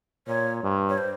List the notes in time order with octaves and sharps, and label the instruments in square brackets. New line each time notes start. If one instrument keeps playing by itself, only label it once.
[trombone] A#2 [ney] C#5
[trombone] G2
[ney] C#5
C5